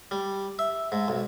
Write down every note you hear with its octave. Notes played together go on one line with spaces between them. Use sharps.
G3
E5
G#2
B1